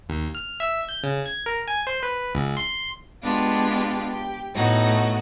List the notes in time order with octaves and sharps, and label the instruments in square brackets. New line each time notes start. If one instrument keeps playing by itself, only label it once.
[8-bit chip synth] D#2
F6
E5
G6
C#3
G#6
A#4
G#5
C5
B4
C#2
C6
[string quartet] G#3 B3 D4 F4 G4
G4
A2 A3 B3 D#4 F#4